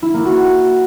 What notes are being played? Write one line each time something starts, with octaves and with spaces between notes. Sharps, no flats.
E4
A#3
F#4